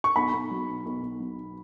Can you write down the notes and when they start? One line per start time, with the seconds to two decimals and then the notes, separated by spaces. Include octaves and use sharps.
0.04 C#6
0.16 B1 B5
0.34 B1
0.51 F#3
0.68 B2
0.86 B1
1.02 B1
1.20 F#3
1.37 B2